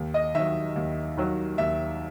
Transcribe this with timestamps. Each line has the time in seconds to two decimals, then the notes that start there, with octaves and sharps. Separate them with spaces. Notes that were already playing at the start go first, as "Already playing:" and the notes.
Already playing: D#2
0.14 D#5
0.35 D#3 E5
0.39 F#3
0.76 D#2
1.17 D#3 F#3
1.58 D#2 E5